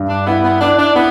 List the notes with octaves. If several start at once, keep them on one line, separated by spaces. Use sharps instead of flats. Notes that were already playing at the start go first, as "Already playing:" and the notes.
Already playing: G2
D4
B3 E4
B3
D4 E4
D4
B3 E4